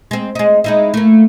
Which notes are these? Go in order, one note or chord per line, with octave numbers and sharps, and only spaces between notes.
G#3 C4
G#3 D#4
G#3 D#4 E4
A3 A#3